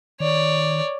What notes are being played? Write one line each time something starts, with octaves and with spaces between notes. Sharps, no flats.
D#3 C#5 D5